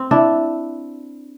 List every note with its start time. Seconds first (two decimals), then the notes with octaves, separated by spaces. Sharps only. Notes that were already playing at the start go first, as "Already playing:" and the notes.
Already playing: C4
0.11 D4 E4